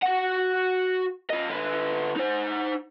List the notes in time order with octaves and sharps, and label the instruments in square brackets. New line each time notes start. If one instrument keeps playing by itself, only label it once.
[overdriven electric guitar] F#4 F#5
F4 D#5
D3 B4
D#4 C5